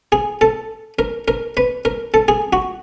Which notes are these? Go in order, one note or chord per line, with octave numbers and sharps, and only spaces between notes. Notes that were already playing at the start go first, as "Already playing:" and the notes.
G#4
A4
A#4
A#4
B4
A#4
A4
G#4
F#4